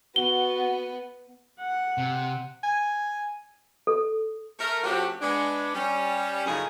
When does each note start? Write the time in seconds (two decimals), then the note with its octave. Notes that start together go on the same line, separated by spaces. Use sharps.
0.16 B3 F#4 G7
1.60 F#5
1.98 C3
2.63 G#5
3.87 A4
4.59 A3 A#4
4.84 F3 A3 C4 C#4 F#4 G4
5.21 G#3 B3 D4
5.74 G3 C#4
6.46 F#2 A2 C#3 F3 D#4 G#4